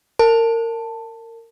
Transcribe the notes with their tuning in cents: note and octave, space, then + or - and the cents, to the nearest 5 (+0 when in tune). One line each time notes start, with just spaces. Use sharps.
A#4 -25 A5 +10